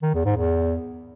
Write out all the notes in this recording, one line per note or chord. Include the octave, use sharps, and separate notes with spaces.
D#3
E2
G#2
E2